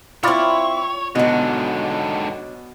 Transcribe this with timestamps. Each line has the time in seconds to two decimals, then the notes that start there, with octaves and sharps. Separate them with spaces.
0.23 C4 E4 F4 C#5 D5
1.15 G#2 B2 D3 F#3 D4